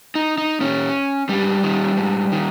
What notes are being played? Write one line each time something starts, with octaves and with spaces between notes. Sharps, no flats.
D#4
D#4
A#2 C#4
G#2 G3
D#3
G#2
D#3